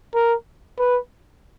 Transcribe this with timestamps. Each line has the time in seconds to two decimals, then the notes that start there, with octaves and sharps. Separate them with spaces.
0.15 A#4
0.78 B4